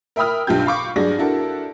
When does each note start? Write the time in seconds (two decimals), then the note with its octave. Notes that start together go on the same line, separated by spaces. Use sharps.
0.16 A#4 E5 G5 B5 D#6 F6
0.47 B1 G2 F4 G4 G6
0.66 F5 B5 C#6 D6
0.96 G2 F#3 G#4 D5 A#6
1.19 D4 E4 F#4 A4 A#4